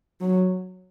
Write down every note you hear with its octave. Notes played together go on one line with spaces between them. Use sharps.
F#3